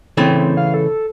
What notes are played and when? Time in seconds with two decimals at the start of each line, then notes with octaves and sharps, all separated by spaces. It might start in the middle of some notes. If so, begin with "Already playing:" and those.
0.17 C#3 E3 A3 C4
0.39 C4
0.57 F5
0.74 A4